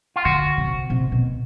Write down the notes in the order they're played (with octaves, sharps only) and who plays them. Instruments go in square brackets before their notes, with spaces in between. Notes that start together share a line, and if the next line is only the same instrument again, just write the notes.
[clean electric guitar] F4
[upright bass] D3 [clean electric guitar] F#4
[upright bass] C3
C3
B2